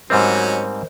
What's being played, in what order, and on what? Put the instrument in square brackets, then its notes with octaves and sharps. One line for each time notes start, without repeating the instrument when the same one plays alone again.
[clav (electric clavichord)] G#2 G3 C4 [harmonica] F#3 C#4 [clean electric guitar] A#4 C5 D#5